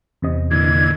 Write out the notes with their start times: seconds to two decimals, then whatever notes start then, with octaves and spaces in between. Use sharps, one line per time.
0.22 E2 C3 D#5
0.51 A#2 D3 E3 G#6